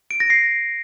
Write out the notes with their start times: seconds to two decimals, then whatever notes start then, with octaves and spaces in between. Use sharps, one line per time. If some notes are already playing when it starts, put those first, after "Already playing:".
0.11 D7
0.20 A#6
0.30 C7